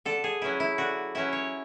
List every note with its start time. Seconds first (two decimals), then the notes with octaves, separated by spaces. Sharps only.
0.05 D3 A4
0.24 G#4
0.42 F#3 C#4 E4
0.60 E4
0.78 D3 F#4
1.15 F#3 C#4 E4 E5
1.33 C#5